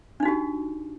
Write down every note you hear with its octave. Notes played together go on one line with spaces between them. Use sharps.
D4 D#4 F#4 G4